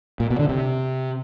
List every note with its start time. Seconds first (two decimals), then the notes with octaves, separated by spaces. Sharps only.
0.20 A#2
0.30 B2
0.39 D3
0.49 C3